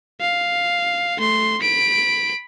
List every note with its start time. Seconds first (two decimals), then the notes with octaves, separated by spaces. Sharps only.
0.20 F5
1.18 A3 C6
1.61 B5 D7